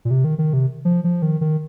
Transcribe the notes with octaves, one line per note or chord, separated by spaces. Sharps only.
A#2
C3
D#3
D#3
C3
F3
F3
D#3
D#3